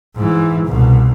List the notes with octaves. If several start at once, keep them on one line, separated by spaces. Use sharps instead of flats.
G#2 E3
C2 B2